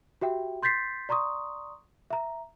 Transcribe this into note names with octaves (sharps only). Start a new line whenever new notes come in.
F#4 G4 E5 G5
C6 G6 A6 B6 C7
D5 A#5 C6 C#6 D#6
E5 A#5